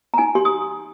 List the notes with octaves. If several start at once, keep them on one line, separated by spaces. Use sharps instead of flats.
A#5
D#4 G#5
G4 C6
D#6